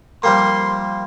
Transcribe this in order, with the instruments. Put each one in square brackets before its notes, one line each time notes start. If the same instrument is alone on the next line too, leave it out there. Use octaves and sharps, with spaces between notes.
[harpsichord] F3 G3 A#3 [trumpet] C6